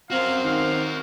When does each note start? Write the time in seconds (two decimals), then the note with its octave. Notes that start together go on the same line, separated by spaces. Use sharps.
0.10 C4 F#4 A#4 F5
0.45 D#3 F5